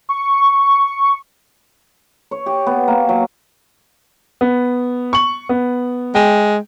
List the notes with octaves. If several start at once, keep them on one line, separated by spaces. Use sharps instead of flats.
C#6
C#5
G4
B3
A#3
F#3
B3
C#6 F#7
B3
G#3 G5